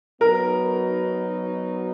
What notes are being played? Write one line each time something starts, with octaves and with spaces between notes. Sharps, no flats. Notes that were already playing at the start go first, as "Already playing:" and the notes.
F#3 B3 D#4 F#4 A#4 B4